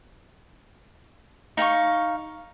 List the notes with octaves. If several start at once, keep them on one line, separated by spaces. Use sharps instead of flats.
D#4 F5 G#5 C#6